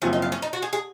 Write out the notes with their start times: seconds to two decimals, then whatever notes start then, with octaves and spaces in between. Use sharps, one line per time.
0.02 F#1 F#2 F3 C4 C#4
0.13 D#4
0.22 F4
0.32 C#4
0.42 D#4
0.53 F#4
0.62 G#4
0.73 G#4